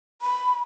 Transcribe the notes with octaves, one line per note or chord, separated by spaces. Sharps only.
B5